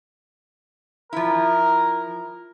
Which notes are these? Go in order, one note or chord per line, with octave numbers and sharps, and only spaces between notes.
F3 E4 A#4